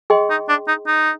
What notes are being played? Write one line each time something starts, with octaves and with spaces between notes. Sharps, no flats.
G#4 D#5 G5 C6
D#4
D4
D#4
D#4